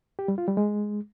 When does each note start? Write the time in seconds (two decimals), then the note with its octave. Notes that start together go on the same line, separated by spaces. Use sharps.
0.19 G4
0.28 G3
0.38 F4
0.48 G3
0.57 G#3